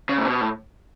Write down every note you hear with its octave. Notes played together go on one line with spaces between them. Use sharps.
C#3
A2
B2
A2